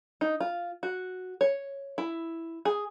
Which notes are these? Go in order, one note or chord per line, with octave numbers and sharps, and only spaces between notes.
D#4
F4
F#4
C#5
E4
G#4